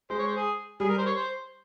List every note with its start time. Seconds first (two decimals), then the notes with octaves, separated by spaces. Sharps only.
0.10 G#3 C5
0.19 C#5
0.28 C5
0.37 G#4
0.80 G3 G#4
0.89 A#4
0.98 C5
1.06 C#5
1.16 C5